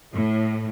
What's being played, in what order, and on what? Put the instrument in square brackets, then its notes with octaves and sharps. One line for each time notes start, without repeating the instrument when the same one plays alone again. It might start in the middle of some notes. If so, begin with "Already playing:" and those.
[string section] A2